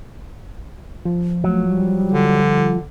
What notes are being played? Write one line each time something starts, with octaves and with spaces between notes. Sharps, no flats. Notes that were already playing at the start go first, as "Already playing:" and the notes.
F3
F#3 A3
G3
D3